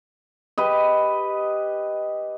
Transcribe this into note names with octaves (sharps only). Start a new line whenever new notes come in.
G4 B4 D#5